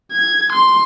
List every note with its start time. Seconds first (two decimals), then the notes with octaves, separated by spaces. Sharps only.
0.12 G#6
0.53 C6